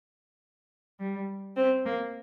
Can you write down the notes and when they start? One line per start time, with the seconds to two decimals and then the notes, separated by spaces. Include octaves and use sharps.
0.99 G3
1.56 C4
1.85 A#3